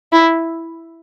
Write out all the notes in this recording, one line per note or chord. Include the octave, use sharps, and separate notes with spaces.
E4